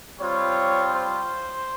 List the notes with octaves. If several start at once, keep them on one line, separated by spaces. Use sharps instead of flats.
G3 C4 F4 C#5
C5